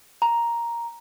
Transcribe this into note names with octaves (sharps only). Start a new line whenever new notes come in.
A#5